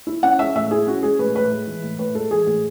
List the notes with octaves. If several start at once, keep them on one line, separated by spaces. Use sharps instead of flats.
E4
C#4 F#5
G#3 E5
A2 E5
E4 G#4
C#4 F#4
G#3 G#4
A2 B4
A2 B4
G#3
E3
A2
A2 B4
G#3 A4
E3 G#4
A2 G#4